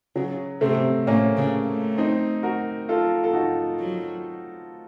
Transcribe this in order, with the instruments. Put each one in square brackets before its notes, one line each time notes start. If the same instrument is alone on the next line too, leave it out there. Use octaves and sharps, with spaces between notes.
[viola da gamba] C#3 [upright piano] F#3
[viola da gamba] C3 [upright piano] A3 C4
[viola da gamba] A2 [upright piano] A#3 C#4
[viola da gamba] C#3
A3
[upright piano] C4 D#4
F#4 A#4
F4 A4
A4
D#4 F#4
[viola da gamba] F#3